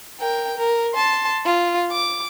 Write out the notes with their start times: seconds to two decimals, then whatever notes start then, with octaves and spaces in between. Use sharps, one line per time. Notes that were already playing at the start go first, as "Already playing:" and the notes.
0.20 A#4 G5
0.57 A#4
0.94 A5 C6
1.45 F4
1.92 D6